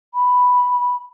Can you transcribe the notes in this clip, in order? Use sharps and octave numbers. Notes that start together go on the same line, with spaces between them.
B5